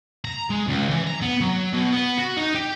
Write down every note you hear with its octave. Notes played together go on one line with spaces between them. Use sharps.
A#5
G#3
C#2
E3
A#5
B3
F#3
B2
B3
F#4
D#4
G4